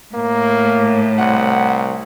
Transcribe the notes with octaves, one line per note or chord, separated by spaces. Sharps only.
A2 A#3
C2 F#5